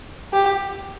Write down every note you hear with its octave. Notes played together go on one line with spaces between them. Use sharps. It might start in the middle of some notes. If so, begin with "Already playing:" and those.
G4